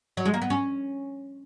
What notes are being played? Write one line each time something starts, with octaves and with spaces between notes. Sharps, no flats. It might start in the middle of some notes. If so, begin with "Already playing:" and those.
F#3
G#3
A#3
B3
C#4